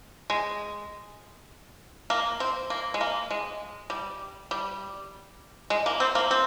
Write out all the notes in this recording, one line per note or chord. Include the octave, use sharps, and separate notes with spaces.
G#3
A#3
C4
A#3
G#3
A#3
G#3
G3
G3
G#3
A#3
C4
A#3
C4